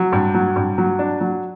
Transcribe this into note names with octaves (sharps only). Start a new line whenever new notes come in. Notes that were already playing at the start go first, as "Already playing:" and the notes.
Already playing: F#3
G2
F#3
G2
F#3
D4
F#3